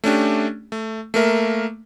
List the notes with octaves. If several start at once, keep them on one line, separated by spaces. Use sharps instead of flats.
A3 C#4 D4 G4
A3
A3 A#3 A#4 E5